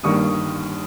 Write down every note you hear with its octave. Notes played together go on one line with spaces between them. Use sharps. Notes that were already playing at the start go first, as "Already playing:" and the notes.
G1 G2 D#3 G3 A#3 C#6 D#6